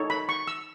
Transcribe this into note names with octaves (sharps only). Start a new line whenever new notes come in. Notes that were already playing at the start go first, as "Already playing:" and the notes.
Already playing: D#4 A4 C#5
B5
C#6
E6